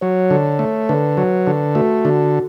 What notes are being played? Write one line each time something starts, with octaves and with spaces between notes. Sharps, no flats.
F#3 C#5
D3
A3
D3 B4
F#3
D3
A3 F#4
D3 F#4